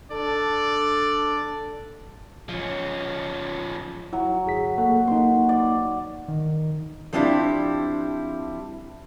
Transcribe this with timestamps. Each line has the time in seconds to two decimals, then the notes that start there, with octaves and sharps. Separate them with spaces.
0.11 D4 A4 D5
2.49 F3 C#4
4.13 F#3 E4
4.46 G1 G#4 B6
4.78 A#3 F#4 A4
5.08 A#3 D#4 C6
5.49 D5
6.28 D#3
7.13 F3 G3 C4 D4 E4 G4